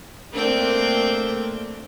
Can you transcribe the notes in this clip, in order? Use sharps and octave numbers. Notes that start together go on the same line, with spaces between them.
A3 A#3 C4 D4 G5